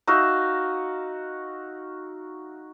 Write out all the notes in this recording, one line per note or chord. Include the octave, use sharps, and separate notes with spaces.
D#4 F#4 E5 F5